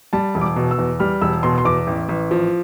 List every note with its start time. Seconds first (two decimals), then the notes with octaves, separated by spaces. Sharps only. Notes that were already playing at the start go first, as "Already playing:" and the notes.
0.13 G3 A5
0.35 E1
0.41 D6
0.56 B2
0.71 E6
0.78 E2
1.00 G3 F6
1.21 E1 E6
1.43 B2 C6
1.58 C6
1.65 E2 D6
1.87 A1
2.09 A1
2.31 F3